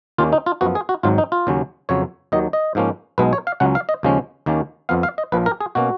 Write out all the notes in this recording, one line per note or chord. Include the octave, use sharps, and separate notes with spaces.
D#2 D#3 A#3 C#4 F4
D#4
F4
F#2 F3 B3 F#4
G#4
F#4
G#1 G#2 F#3 F4
D#4
F4
D#2 C#3 F#3 C#4
F2 C#3 F#3 C#5
D#2 D#3 F#3 D#5
D#5
G#2 F3 A#3 C#4
B1 B2 G#3 B3 B4
C#5
F5
C#2 C#3 F#3 C#4 F#5
F5
D#5
D#2 C#3 F3 G#3 C#4
D#2 D#3 A#3 C#4
F2 F3 B3 F5
F5
D#5
A#1 A#2 F3 B4
A#4
G#4
B2 A#3 C#4 F#4